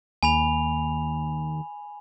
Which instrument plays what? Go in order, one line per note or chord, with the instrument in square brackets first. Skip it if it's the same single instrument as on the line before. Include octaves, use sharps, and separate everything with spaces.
[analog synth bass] D#2 [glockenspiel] G#5 B5 F7